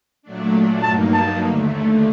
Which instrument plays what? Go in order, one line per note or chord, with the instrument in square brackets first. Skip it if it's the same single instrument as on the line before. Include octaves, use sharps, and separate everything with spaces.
[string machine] A#2 F#3 A3 D4
[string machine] G2 F#3 A#3 D#4 [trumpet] A5
[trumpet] A5
[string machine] D#2 D3 A3